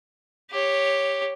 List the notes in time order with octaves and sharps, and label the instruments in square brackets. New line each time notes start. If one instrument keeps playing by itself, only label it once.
[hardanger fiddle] G4 C#5